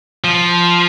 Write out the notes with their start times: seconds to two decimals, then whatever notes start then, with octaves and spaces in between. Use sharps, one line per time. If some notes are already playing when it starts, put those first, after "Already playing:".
0.24 F3